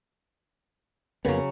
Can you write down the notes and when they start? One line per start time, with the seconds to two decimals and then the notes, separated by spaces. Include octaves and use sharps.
1.25 F2 C#3 F#3 A#3 B3